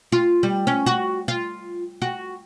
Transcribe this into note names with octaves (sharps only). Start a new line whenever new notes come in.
F4
G3
C#4
F#4
F4
F#4